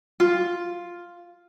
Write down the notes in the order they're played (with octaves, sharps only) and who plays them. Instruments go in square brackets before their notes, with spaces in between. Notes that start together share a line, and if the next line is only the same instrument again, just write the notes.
[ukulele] F4